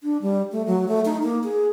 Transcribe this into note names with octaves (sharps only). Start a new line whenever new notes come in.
D4
G3
A3
F#3
A3
D#4
A#3
G#4